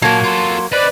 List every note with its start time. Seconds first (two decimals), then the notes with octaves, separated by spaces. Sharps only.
0.02 A#2 F#3 A#3 A5
0.24 F4 A4 C6
0.72 B4 C5 D5 D#5 B5